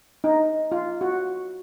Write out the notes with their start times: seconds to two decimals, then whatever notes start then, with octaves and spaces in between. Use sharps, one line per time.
0.24 D#4
0.72 F4
1.01 F#4